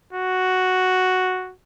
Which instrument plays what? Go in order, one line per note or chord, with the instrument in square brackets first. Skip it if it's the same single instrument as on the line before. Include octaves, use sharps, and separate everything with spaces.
[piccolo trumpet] F#4